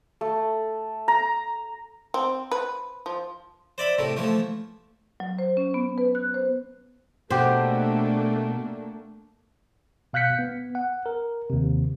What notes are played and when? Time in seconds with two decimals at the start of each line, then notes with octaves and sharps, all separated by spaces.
0.21 A3
1.08 A#5
2.14 C4
2.51 B4
3.06 F3
3.78 C5 D5 E5 B5
3.98 A2 C3 A3
4.17 E3 F3 A3
5.20 F#3
5.39 C5
5.57 C#4
5.74 B3
5.98 B4
6.15 F#6
6.34 C5
7.30 B2 A3 A#3 D4 G4 C5
10.13 B2 F5 F#6 G6 B6 C#7
10.39 B3
10.75 F#5
11.06 A#4
11.50 D#2 C3